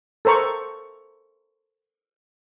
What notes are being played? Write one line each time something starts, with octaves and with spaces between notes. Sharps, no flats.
A4 A#4 C5 A#5 C#6